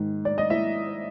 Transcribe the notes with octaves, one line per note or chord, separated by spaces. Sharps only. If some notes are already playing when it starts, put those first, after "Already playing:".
Already playing: G#2 D#3
D5
D#5
E4 E5